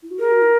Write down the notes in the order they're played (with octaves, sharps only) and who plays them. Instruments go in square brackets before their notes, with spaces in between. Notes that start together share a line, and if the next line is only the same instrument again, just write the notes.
[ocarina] E4
F#4
[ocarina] G#4 [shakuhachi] A#4
[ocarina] F#4
E4